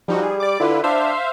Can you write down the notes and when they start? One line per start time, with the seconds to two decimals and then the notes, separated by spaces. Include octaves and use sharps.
0.08 F3 G3 D#4 F#4
0.23 G#4
0.40 D5 D6
0.60 D3 E4 F4 B4
0.84 D4 C5 E5 F5